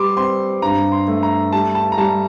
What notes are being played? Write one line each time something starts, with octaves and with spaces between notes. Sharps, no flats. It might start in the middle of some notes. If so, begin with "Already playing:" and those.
Already playing: G3 C6 D6
C4 C6
G2 A#5
C6
A3
A#5
G3 A5
A5
A#5
G3 A5